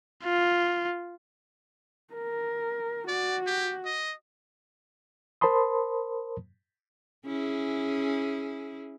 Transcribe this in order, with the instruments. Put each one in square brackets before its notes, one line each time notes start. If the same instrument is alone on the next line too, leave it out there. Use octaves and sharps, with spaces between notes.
[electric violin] F4
[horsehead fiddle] A#4
[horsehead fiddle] F#4 [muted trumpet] D5
[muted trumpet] G4
D#5
[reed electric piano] A#4 C5 A5 B5 C6 D#6
[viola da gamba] C#4 E4 G#4